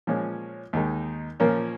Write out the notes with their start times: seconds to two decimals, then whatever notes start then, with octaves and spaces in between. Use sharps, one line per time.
0.07 A#2 F3 G#3 C#4
0.73 D#2 D#3 G#3 D#4
1.40 A#2 F3 A#3 C#4